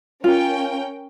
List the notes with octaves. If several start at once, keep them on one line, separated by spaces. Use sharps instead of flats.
C#4 F4 A#4 G5